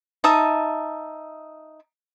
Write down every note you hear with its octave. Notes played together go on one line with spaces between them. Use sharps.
D#4 E5 A5 D#6